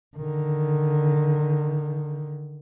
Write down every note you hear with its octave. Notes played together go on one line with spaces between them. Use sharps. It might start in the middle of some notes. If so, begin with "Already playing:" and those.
D3 D#3